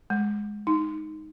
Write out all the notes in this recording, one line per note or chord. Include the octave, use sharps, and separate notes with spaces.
G#3
D#4